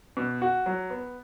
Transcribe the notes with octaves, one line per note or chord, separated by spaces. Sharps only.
B2
F#4
F#3
B3